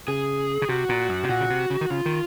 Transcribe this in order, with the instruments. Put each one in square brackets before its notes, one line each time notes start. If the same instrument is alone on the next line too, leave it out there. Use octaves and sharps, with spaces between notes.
[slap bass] C#3 [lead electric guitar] G#4
[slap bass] C#3
[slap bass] C3 [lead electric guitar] F#4
[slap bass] A#2
F#2
C3
[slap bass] A#2 [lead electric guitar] F#4
[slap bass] C#3
C3
C#3
D#3
[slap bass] C#3 [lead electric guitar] F4
[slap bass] D#3